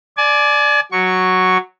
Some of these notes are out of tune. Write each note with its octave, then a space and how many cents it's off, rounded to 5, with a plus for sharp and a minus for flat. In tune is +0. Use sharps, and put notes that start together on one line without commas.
D5 +0 G#5 +35
F#3 +0 C#6 +0